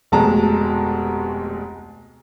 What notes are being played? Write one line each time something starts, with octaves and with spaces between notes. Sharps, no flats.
F1 D2 B2 G#3 A5 A#5